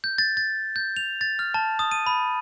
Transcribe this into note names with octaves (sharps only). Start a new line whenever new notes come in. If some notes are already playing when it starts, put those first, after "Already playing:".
G6
A6
A6
G6
F7
A6
F6
A5
D#6
D#7
B5